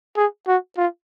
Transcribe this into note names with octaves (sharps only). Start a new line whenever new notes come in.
G#4
F#4
F4